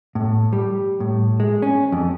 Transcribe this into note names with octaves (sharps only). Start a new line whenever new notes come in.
A2
G3
A2
G#3
C#4
F2